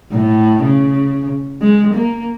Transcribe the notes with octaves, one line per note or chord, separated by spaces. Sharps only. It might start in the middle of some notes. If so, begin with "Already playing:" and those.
A2
C#3
G#3
A#3